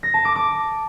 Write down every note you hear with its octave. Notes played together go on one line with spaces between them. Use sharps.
A#6
A5
D6
D6